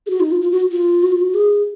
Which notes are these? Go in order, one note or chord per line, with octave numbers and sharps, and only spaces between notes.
G#4
F#4
D#4
F4
F4
F#4
F4
F#4
F4
F#4
G#4